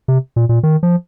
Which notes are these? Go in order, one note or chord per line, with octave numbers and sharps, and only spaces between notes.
C3
A#2
A#2
D#3
F3